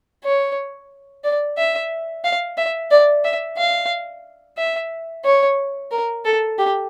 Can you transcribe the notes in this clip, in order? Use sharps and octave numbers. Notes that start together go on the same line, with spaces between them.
C#5
D5
E5
F5
E5
D5
E5
F5
E5
C#5
A#4
A4
G4